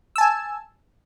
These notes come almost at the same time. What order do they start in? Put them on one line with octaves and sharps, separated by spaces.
E6 A5 G#5